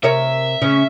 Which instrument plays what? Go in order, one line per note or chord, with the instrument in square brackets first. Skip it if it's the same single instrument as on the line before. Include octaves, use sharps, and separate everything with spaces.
[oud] C3 A#4 C#5 [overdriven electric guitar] E5
[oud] C#3 C#4